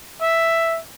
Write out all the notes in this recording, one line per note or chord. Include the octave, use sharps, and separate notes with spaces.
E5